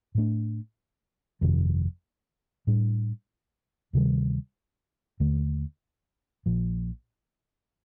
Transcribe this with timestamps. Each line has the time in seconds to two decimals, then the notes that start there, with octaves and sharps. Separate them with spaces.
0.15 A2 A3 D4
1.41 G1 F2 C3 D#3
2.67 A2 G3 D4
3.93 D2 C3 D#3 G3
5.20 D#2 D3 A3
6.46 A#1 A#2 F3